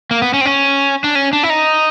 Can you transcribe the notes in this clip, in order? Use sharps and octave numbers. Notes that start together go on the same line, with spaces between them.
A#3
B3
C#4
C4
C#4
D4
C#4
D4
E4
D#4